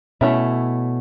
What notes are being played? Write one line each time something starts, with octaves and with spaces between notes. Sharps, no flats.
B2 A3 C#4 E4